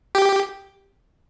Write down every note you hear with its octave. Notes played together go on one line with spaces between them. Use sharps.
G4